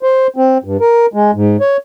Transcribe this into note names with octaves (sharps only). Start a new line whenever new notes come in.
C5
C4
G2
A#4
G#3
G#2
C#5